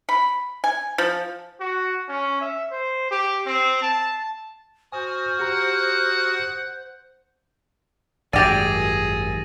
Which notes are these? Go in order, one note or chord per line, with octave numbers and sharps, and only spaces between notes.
B5
G#5
F3
F#4
C#4
E5
C5
G4
C4
A5
F#4 C5 G#5 D#6 F6
G4 F#5 A#5
G#1 F#2 G4 G#4 D5 A6 A#6 D#7